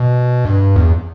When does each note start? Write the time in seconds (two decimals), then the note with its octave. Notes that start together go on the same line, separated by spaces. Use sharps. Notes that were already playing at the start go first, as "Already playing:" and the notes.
Already playing: B2
0.45 G2
0.76 E2